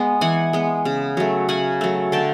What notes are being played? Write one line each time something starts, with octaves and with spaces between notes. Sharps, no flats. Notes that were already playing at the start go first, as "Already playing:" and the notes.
Already playing: G#3 B3
E3 F#5 G#5
G#3 B3
C#3
F#3 A3
C#3 F#5 G#5
F#3 A3
D3 G5 A5